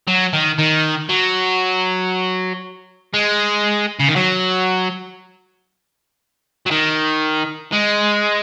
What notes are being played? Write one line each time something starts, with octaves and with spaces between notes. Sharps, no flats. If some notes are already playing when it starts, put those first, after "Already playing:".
F#3
D#3
D#3
F#3
G#3
C#3
D#3
F#3
F#3
D#3
G#3